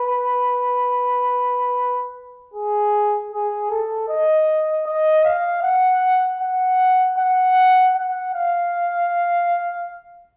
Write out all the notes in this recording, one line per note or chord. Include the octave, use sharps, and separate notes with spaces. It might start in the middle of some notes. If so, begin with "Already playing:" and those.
Already playing: B4
G#4
G#4
A4
D#5
D#5
F5
F#5
F#5
F#5
F#5
F5